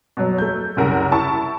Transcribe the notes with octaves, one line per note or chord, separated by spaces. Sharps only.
B2 F#3
A3 G6
F#1 C2 A#4 F#5
E4 A5 C#6